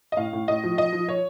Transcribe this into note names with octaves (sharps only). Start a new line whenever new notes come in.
D#5
A2 F5
A2
A2 D#5
F3
F3 D#5
F3
F3 C#5